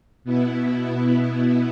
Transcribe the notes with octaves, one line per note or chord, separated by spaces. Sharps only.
B2 B3 E4